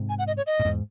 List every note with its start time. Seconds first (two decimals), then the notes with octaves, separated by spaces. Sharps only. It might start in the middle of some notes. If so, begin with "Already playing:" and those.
Already playing: G#2 C3
0.09 G#5
0.19 F#5
0.27 D#5
0.37 C#5
0.47 D#5
0.59 A2
0.65 E2 G#2